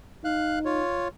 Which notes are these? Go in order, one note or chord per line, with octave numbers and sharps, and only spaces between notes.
D#4 F5 F#6
F4 C#5